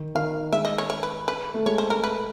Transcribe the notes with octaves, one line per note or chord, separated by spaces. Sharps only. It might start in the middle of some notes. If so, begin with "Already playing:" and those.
Already playing: D#3
D#3 F5
G#3 E5
D#5
C#5
C#5
B4
B4
A3
G#3 C#5
C5
A#4
B4